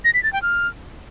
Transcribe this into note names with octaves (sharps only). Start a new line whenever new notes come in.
A#6
B6
A6
G5
F6